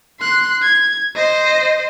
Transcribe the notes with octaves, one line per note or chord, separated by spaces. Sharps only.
C6 F#6
G#6
C5 D#5